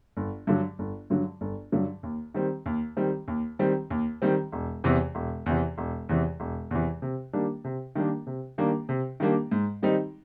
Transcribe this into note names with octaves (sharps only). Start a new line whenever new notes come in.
G1
G2 D3 F#3
G1
G2 D3 F#3
G1
G2 D3 F#3
D#2
D#3 G3 C4
D#2
D#3 G3 C4
D#2
D#3 G3 C4
D#2
D#3 G3 C4
E1
E2 C3 E3
E1
E2 C3 E3
E1
E2 C3 E3
E1
E2 C3 E3
C3
D#3 G3 A#3 D4
C3
D#3 G3 A#3 D4
C3
D#3 G3 A#3 D4
C3
D#3 G3 A#3 D4
G#2
D#3 G3 C4 D#4